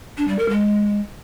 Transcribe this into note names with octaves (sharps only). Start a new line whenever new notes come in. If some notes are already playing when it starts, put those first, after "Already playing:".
D4
G3
A#4
G#3